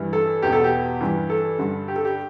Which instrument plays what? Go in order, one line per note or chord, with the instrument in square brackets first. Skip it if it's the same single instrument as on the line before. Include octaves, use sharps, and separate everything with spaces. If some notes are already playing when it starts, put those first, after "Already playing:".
Already playing: [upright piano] G2 E3
A4
E2 B2 G4
A4
G4
G2 E3
A4
G2 D3
G4
A4
G4